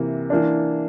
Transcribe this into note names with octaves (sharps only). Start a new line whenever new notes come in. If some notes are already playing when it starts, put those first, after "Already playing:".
Already playing: C3 E3 A#3
E3 A#3 D4